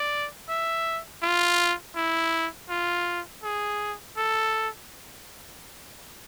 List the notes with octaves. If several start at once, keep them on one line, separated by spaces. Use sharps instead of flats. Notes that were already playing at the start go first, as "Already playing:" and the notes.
Already playing: D5
E5
F4
E4
F4
G#4
A4